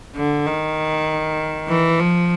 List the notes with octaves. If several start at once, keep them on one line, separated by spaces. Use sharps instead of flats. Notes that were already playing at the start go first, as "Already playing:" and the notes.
D3
D#3
E3
F3